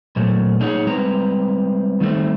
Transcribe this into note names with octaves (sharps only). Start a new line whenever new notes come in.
A#2 F#3 A3
A#3 D4 D#4 G#4 C#5 F#5
G3 G#3 C4 B4 A#5
D#3 G3 A3 C4